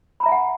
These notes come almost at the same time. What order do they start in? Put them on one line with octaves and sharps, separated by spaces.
B5 A#5 E5 G#5 F#5